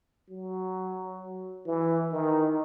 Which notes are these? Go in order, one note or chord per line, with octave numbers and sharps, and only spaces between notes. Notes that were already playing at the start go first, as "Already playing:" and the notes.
F#3
E3
D#3